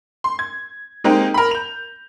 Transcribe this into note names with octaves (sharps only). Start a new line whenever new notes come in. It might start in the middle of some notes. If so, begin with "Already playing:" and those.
C6
G#6
G#3 A#3 C4 D#4 G4
A#4 B5
G6 F7